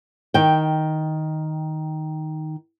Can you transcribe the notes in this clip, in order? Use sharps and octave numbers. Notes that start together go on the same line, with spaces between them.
D#3 G5